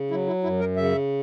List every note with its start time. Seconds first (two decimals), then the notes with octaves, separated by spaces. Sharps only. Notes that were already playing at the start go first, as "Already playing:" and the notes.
Already playing: C#3
0.10 F#3 E4
0.27 E4
0.43 F#2 E4
0.60 A#4
0.77 C#3 E5